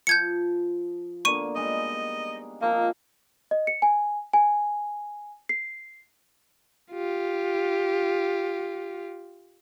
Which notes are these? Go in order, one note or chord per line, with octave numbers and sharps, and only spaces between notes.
F3 G6 G#6 C#7
D3 A#3 B3 C#6 D#7
G3 G#3 D#4 D#5
F3 A#3 C4 D#4
D#5
C#7
G#5
G#5
C7
F4 G4